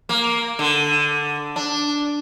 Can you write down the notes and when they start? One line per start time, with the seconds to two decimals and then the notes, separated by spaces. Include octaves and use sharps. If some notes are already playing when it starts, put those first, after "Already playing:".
0.09 A#3
0.59 D3
1.56 D4